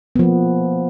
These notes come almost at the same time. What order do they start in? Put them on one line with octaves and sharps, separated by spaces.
B3 F3 A#3